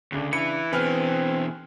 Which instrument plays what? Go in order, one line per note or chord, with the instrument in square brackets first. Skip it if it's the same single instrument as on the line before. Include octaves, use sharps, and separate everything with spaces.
[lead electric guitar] D2 [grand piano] C#3 D4
[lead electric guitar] E4 B4 [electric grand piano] C#7
[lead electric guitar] B2 E3 [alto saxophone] C4 [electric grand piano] B4 [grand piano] G#5 F6